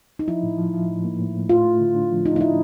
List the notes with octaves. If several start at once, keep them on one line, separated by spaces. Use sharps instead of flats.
D#4
F3 E4
A2
F3
F3
A2
A#3
A2
A2
A3 F4
A3
D3
D4
F3
D4 D#4
D#4
D4 E4